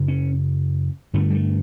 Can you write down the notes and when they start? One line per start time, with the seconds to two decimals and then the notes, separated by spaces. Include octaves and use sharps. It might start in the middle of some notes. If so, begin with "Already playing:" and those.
Already playing: F#2 C#3
0.08 C#4
1.13 G2 D3 A3
1.30 G3
1.35 A3